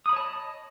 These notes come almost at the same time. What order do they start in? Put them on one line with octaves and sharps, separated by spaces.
D#6 B5 C#5 A5 D#5